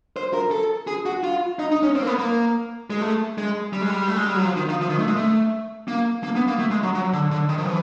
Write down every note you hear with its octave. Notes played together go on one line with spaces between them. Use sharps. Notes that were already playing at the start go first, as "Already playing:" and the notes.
C5
A#4
A4
G#4
F#4
F4
D#4
D#4
C#4
C4
A#3
B3
A#3
G#3
A3
G#3
G3
G#3
G3
A3
G#3
G3
F#3
F3
D#3
F3
F3
D#3
A3
G#3
A3
A#3
A#3
B3
A#3
A3
G#3
F#3
F#3
D3
D3
D#3
F3
E3